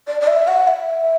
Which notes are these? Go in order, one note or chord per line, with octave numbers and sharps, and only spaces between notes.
D5
D5
E5
F#5
E5